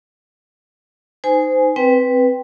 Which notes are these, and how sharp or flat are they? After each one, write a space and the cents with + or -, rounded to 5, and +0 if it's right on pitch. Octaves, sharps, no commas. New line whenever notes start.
D#4 +0 C5 -25 G#5 +0
C4 +0 B4 +0 G5 +0